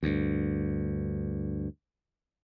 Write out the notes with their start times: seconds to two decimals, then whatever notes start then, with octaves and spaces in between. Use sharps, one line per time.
0.03 D2 G2